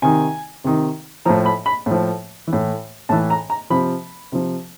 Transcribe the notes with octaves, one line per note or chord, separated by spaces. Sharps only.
C3 D#3 G#5
C3 D#3
A2 F3 A#5
B5
B5
A2 F3
E3
A2
A2 E3 A5
A#5
A#5
C3 F3 B5
C3 F3